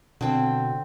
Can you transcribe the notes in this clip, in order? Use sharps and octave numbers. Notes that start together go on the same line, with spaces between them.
B2 D3 C4